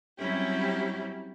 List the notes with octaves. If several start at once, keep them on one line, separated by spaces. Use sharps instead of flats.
F#3 G3 C4 C#4 E4 G4